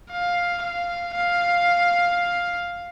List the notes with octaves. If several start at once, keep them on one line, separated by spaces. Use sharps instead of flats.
F5
F5
F5